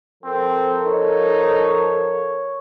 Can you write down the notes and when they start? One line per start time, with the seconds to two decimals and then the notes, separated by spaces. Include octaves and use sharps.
0.24 F3 C4 A4 A#4
0.86 D#4 C#5